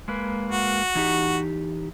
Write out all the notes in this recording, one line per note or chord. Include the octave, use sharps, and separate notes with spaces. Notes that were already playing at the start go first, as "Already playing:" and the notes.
G#3 A#3 B4
F#4
E3 D#4 G4